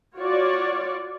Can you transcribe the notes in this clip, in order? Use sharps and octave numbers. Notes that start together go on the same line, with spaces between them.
F4 F#4 C#5 D5